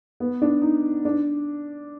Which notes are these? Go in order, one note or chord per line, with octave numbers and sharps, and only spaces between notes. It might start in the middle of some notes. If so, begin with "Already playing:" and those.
B3
D4
D#4
D4